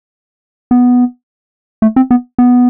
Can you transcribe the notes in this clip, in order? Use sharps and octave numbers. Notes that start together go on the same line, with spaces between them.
B3
A3
C4
B3
B3